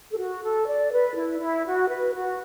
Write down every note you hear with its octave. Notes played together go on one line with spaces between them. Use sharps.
A4
F#4
A4
D5
B4
E4
E4
F#4
B4
F#4